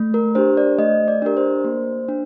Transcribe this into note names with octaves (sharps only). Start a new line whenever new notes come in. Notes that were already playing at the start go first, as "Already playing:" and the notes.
Already playing: A3
A#4
D4 G4 C5
D5
A3 D#5
D5
D4 G4 A#4
C5
A#3
D4